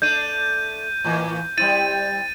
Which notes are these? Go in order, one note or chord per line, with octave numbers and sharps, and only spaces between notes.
A3 D4 G6 D#7
A2 E3 A#3
G3 C4 E4 A6 D#7